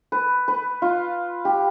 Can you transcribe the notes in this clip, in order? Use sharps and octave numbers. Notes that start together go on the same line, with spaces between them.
B4
B4
F4
G4